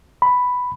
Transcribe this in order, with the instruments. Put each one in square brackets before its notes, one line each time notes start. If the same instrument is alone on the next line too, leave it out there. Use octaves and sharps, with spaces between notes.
[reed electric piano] B5